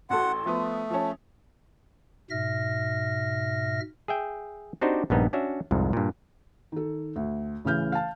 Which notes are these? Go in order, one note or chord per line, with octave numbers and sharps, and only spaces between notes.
A1 F#4 A4 F#5 C6
F3 A3 B3 D#6
F3 C#4 A5
G#2 B2 E5 F6 A#6
G#4 E5 G5
C4 D4 D#4 F#4 G4 C5
A#1 G2 B3 D#4
C#4 D4 F#4 C#5 E5
C2 F2 G#2
G2 A#2
D#3 A4
D2
A1 C#3 E3 F6 G6
F5 A5